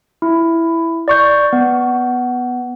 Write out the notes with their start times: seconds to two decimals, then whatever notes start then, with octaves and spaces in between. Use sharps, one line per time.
0.22 E4
1.08 D5 C#6 G6
1.53 B3